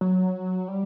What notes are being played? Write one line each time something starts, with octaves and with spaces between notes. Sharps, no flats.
F#3
G3